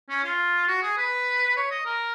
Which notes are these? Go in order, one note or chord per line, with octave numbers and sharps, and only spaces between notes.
C#4
F4
F#4
G#4
B4
C#5
D#5
A#4